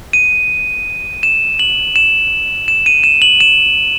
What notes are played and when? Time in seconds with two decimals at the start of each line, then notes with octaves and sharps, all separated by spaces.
0.13 D#7
1.23 E7
1.59 F#7
1.96 E7
2.68 E7
2.86 D#7
3.04 E7
3.22 F#7
3.40 E7